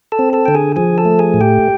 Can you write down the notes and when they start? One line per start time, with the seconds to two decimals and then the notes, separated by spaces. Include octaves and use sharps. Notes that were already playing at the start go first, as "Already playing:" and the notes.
0.12 A4 A5
0.19 C4
0.33 A4 A5
0.46 D3 G5
0.55 G#4 G#5
0.76 F3 G#4 G#5
0.98 A4 A5
1.05 A3
1.19 G#4 G#5
1.34 A2
1.41 G4 G5